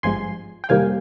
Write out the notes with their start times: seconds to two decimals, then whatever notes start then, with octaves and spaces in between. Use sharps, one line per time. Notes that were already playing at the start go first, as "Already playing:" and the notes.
0.03 G#1 G2 F3 G#3 G#5 C6
0.64 G5
0.69 F2 C3 D#3 G3 A#3 F5 G#5